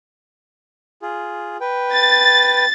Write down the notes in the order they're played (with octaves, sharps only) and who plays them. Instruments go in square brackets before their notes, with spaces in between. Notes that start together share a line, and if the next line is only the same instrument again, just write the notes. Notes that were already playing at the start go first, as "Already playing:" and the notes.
[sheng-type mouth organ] F4 G#4
B4 G5
[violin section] A6